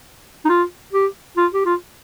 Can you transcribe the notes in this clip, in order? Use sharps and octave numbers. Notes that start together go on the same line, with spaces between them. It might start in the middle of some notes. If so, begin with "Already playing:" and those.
D#4
F4
G4
F4
G4
F4